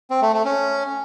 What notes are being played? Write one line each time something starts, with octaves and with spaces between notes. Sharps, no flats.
C4
A3
A3
C#4